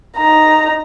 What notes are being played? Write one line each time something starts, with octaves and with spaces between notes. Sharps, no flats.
D#4 A#5